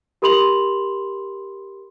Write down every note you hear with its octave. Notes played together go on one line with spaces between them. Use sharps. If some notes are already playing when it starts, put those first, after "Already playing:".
G4 A#4 B5 C6 F7 F#7